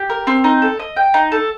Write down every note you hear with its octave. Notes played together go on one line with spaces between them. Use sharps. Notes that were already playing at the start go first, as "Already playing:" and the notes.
Already playing: G4
A#4
C4
D#4
A4
D#5
G5
D#4
A4